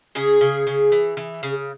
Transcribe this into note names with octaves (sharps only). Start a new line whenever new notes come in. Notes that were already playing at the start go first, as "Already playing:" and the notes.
C#3 G#4
C#3
C#3
E3
E3
C#3